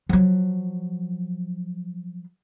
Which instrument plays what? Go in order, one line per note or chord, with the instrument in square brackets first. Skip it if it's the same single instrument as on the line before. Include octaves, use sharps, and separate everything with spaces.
[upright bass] F3 F#3